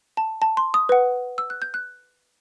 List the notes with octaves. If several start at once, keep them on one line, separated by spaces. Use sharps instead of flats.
A5
A5
C6
D#6
B4 F#5
E6
F#6
G6
F#6